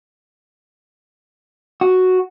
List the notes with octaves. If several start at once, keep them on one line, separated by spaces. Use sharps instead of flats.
F#4